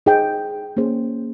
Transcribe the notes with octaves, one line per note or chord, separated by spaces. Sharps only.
D#4 G#4 C5 G5
A#3 C#4 G#4 C5